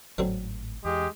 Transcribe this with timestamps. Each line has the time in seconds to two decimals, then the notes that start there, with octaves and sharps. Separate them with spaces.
0.18 G#1 A2 D3 F#3 C4
0.85 E2 G#3 G4